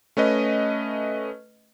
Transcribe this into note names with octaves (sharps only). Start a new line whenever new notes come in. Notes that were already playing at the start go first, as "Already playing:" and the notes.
A3 C#4 B4 D#5